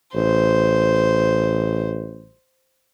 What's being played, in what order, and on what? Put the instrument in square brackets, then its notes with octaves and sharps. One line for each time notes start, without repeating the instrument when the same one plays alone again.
[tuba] A1 [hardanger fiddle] C5